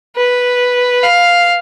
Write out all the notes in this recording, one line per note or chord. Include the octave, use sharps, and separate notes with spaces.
B4
F5